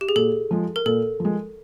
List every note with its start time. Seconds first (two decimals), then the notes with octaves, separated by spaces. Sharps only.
0.01 G4
0.09 G#4
0.16 A#2 A4
0.51 F3 G#3
0.76 A#4
0.86 A#2 A4
1.20 F3 G#3